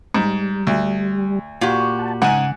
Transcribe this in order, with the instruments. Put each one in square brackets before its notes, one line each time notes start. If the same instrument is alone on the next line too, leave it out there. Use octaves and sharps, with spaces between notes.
[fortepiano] G#2 [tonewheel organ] G3
[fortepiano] D2
[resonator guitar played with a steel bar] A#2 F#4 G4
[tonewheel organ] F#5 A5
[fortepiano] G#2 G#5 [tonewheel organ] C#3 [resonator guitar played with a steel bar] F#5